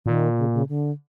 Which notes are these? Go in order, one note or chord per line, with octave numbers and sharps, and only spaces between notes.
A#2 D#3
C#3
C#3
D3